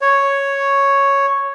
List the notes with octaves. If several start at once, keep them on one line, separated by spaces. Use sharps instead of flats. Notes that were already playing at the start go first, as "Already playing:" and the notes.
C#5